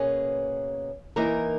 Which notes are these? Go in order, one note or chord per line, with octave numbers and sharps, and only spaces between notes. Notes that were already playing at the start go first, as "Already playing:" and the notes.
Already playing: B2 A#3 C#4 G#4 B4
E3 A#3 D#4 A#4